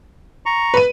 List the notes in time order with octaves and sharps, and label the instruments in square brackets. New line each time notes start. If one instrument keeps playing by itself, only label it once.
[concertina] A#5 C#6
[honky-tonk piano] B4 D#7